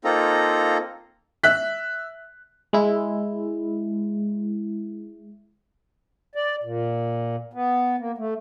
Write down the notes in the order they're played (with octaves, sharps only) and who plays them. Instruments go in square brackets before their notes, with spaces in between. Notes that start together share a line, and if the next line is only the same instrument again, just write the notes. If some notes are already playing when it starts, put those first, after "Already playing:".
[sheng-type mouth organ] A#3 C4 D#4 F4 A4 A#5
[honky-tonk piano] E5 F#6 B6
[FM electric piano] G#3 E4
[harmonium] D5
A#2
B3
A#3
A3